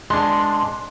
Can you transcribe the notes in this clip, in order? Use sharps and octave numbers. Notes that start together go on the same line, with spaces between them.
G#3 D4 C6